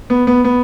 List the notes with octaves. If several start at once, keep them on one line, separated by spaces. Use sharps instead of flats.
B3
B3
B3